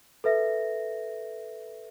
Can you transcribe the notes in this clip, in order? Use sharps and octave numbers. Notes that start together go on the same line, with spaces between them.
A4 B4 E5 A#6